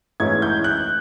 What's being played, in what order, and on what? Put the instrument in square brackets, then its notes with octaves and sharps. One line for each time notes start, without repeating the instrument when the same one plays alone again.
[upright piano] G#2 E3 A3 C#4 G#6
G6
F#6